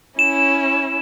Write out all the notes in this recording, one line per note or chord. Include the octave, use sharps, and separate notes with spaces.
C#4 E4 E7